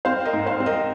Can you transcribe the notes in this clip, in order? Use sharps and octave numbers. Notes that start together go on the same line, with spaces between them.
C4 C5 F5
A#4 D#5
G#2
C5 F5
C4
A#4 D#5